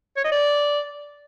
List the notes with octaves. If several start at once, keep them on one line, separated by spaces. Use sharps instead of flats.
C#5
D#5
D5